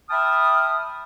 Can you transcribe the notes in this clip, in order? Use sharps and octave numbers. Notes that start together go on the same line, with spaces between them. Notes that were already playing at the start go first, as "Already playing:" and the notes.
E5 G5 A5 B5 D#6 F6